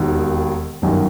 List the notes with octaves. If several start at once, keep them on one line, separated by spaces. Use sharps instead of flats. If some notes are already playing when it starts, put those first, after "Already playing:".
Already playing: E1 D#2 D#3
G1 F#2 D#3